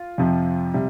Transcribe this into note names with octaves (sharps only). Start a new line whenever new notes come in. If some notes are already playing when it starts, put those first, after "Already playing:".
Already playing: F4
F2 C3 F3
C3 G3